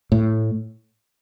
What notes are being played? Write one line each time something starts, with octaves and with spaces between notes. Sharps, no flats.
A2